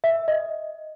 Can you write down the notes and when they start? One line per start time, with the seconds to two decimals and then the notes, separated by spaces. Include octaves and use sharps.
0.04 E5
0.28 D#5